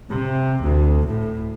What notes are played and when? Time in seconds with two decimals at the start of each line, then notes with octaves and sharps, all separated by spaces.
0.10 C3
0.62 D2
1.06 A2